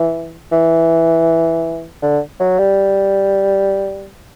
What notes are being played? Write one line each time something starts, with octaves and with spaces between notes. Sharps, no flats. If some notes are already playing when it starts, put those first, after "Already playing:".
Already playing: E3
E3
D3
F#3
G3